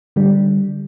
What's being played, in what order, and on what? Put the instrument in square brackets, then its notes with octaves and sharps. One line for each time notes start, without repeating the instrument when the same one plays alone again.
[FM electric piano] D3 G3